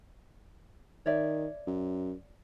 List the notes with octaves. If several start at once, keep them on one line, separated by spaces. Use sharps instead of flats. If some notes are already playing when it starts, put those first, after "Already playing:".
D#3 C#5 D5 E5
F#2